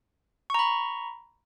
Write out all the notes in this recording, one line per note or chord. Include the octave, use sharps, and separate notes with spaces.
A#5 B5 C#6